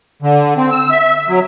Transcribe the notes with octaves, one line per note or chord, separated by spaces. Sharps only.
D3
C4
E6
E5
F#3